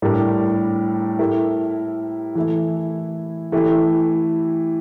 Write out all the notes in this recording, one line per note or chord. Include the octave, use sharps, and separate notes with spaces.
A2 G3 D4 G4 A#4
A3 E4 G4 A#4
E3 A3 E4
E3 A3 E4 G4